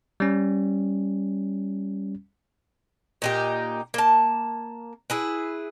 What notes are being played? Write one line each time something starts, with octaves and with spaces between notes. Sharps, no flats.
G3 C#4
A#2 D#4 G4
A#3 A5
E4 G#4 B4